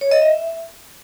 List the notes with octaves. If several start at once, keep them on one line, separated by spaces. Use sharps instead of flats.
C#5
D#5
E5